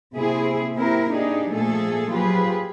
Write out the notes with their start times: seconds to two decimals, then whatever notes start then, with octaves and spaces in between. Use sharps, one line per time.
0.16 C3 A#3 C4 E4 G#4
0.76 A#3 C4 E4 G4 A#4
1.10 D4 D#4 G4 G#4
1.51 A#2 F3 A3 A#3 G#4 A4
2.10 F3 F#3 F4 G4 G#4 B4